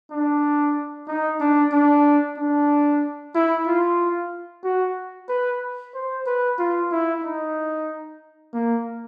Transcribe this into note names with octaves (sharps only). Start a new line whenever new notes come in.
D4
D#4
D4
D4
D4
E4
F4
F#4
B4
C5
B4
F4
E4
D#4
A#3